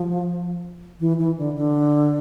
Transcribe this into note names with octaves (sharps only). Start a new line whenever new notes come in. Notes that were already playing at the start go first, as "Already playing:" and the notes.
Already playing: F3
E3
E3
D3
D3